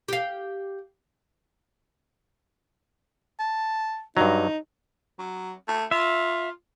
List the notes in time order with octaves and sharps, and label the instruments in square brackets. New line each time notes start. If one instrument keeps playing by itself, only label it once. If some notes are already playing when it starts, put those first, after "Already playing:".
[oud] G4 F5
[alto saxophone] A5
[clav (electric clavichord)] G2 F#3 [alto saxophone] D#4
[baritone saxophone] F#3
A3
[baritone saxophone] F4 [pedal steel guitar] E5